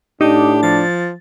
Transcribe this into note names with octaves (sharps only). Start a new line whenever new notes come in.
A2 D4 D#4 G4
F3 A6